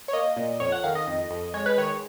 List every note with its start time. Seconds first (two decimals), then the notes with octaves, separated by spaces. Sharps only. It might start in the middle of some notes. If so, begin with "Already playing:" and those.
0.08 C#5
0.13 A#3 D#5
0.37 A#2
0.60 F2 C#5
0.72 F#5
0.84 D#3 F5
0.95 D#5
1.07 F2
1.31 F2
1.54 G#3 C#5
1.66 B4
1.78 D#3 C#5